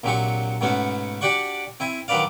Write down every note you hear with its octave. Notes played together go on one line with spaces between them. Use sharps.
A#1 C3 F#3 C4 F#4 C#6
G#2 B2 A3 B3 C#4 F#4
D4 F#4 G4 D5 F#5 C#6
C4 E4 G#5
D#3 F#3 D4 B4 D5 F5